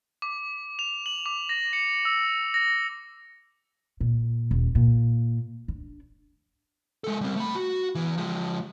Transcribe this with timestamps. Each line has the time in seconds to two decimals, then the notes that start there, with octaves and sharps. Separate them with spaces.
0.22 D6
0.79 F7
1.06 F#7
1.26 D6
1.49 A#6
1.73 C#7
2.05 E6
2.54 A#6
4.01 A#2
4.51 D#1
4.75 A#2
5.68 D4
7.04 G#3 A4
7.21 G3 C4
7.36 A3 B5
7.55 F#4
7.95 E2 E3
8.18 F3 G#3